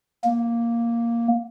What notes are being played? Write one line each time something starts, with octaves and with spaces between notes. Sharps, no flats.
A#3